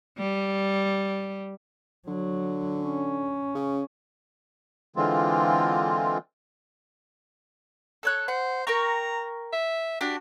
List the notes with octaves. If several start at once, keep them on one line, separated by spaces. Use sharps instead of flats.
G3
D3 F#3
C#4
C#3
D3 E3 G#3 C4 F4
A4 C#5 F#6
C5 F#5
A#4 G5 A#5 C#6
E5
D4 F#4 G4